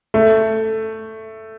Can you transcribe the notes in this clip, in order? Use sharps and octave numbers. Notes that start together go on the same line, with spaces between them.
A3